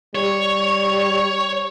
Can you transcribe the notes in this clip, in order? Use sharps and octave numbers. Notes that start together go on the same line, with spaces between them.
G3 C#5